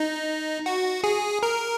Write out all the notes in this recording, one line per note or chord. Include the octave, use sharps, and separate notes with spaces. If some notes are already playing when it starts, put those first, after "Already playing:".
Already playing: D#4
F#4
G#4
A#4